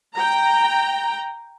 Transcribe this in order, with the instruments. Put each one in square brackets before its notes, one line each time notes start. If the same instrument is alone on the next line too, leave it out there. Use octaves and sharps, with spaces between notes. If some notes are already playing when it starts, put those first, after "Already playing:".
[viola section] G5 A#5